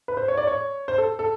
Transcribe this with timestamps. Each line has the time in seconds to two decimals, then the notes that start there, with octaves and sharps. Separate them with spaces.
0.08 B4
0.17 C5
0.28 C#5
0.37 D5
0.47 C#5
0.88 C5
0.98 A4
1.19 A4